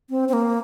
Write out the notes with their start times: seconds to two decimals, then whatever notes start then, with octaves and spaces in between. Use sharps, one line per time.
0.10 C4
0.29 C4
0.33 A#3